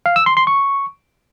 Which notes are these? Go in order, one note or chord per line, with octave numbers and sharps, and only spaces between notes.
F5
E6
C6
C6
C#6